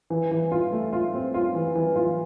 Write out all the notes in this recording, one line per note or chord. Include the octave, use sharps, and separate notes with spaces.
E3
E3
F4
A3
F4
C4
F4
E3
E3
F4